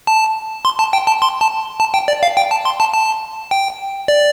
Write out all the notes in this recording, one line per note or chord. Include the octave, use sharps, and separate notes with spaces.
A5
C6
A5
G5
A5
C6
A5
A5
G5
D5
F5
G5
A5
C6
A5
A5
G5
D5